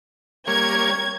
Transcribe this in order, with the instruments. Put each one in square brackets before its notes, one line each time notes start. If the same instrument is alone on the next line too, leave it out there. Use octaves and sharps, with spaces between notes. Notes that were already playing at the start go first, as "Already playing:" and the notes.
[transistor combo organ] G3 A#3 C#5 [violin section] G#6